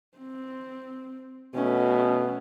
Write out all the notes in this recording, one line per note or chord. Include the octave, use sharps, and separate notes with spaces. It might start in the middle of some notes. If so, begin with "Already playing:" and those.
C4
B2 A3 C#4